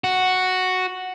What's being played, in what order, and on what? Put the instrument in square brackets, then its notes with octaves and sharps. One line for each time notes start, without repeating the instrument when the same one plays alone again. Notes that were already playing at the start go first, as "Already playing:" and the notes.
[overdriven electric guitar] F#4